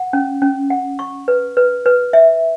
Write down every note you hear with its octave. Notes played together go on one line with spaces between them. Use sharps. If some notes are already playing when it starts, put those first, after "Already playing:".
Already playing: F#5
C#4
C#4
F#5
C#6
B4
B4
B4
E5